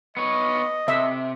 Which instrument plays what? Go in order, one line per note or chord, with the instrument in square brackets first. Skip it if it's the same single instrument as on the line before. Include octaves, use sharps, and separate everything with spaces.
[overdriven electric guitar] B3 C#5 [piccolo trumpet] D#5
[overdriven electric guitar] C3 [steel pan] E5